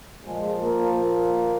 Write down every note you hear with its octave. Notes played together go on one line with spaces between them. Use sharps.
A#2 F3 G#3
A#3
A#3